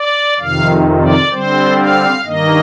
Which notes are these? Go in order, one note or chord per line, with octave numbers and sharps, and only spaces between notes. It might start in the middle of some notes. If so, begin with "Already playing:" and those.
Already playing: D5
F2 C3 D#3 F5
D5
D3 G3 C4 C5
F5
G2 D#3 A#3 D#5